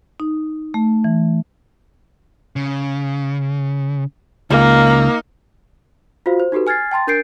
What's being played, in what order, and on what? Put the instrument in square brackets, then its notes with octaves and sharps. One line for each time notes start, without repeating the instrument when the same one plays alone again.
[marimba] D#4
A3
E3
[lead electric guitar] C#3
[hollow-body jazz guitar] C#2 [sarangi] A#3 [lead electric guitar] D#4
[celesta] F4 F#4 C5 F5
C5
D#4 F#4 G4 A4 B4
G#5 F6 G#6 A6 C7
G5 A5 C6 A6
D4 A#4 G6 A6 C7 D7